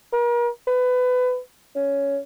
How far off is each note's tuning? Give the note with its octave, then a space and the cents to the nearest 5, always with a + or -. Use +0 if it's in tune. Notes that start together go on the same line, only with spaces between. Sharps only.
A#4 +40
B4 +25
C#4 +10